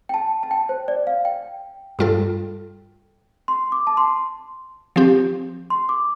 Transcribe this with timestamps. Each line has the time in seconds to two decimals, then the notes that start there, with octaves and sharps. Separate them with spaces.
0.09 G5
0.14 A5
0.43 A5
0.51 G5
0.69 C5
0.88 D5
1.07 F5
1.25 G5
1.99 G2 G3 F4 A4
3.48 C6
3.72 D6
3.87 A5
3.97 C6
4.96 F3 C4 G4
5.70 C6
5.89 D6